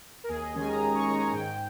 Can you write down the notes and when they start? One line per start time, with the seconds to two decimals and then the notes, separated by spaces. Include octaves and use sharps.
0.24 A#4
0.29 D#2 G#4
0.42 D#5
0.54 D#3 G#3 C#4 G#5
0.68 A#5
0.81 D#2
0.94 C#6
1.07 D#3 G#3 C#4 A#5
1.19 G#5
1.33 G#2 G5